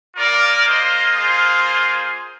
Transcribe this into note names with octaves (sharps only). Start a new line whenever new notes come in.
A#3 F4 A#4 D5
C5 D#5
G#4 C5